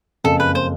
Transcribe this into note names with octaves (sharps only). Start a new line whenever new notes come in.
F#1 F2 C#3 A4
B4
C5